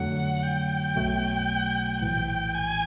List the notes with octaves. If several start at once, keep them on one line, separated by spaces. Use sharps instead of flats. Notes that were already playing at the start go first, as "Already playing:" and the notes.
Already playing: F2 D3 F#3 A3 F#5
G5
B1 B2 F#3 A3
A#1 A2 E3 G5
G#5